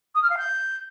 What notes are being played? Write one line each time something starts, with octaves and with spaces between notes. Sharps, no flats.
D#6
F6
F5
G6